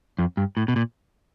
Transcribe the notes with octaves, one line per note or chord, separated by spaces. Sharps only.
F2
G2
A2
B2
A#2